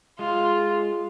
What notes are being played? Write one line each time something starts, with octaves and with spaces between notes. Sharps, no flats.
G#3 F4